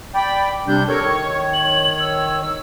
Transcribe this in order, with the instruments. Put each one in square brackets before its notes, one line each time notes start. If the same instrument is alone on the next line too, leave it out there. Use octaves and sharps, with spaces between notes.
[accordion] D5 G5 [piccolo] B5
[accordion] C3 G3 D4 [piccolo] G6
[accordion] A4 A#4 C#5 [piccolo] C#6
[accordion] D#3 C#5
[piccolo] F#7
E6